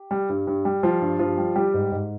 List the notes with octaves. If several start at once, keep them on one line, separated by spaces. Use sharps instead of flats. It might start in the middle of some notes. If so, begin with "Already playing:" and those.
Already playing: G4
G3
G2
G2
G3
F3 G3 F4
G2
G2 F3 F4
G3
G3 G4
G#2
G#2